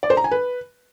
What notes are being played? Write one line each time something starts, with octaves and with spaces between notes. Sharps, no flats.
D5
C5
A#5
G#5
B4